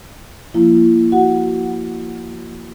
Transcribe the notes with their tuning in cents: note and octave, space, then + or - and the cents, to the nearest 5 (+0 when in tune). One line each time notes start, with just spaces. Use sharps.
F3 +0 A#3 +0 E4 +35
F#4 +20 F#5 +0